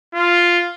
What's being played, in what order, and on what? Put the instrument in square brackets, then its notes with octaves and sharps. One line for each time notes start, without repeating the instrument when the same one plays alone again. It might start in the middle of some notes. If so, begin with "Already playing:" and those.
[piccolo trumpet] F4